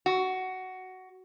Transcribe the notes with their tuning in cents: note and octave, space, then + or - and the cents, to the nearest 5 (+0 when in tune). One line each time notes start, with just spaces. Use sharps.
F#4 +10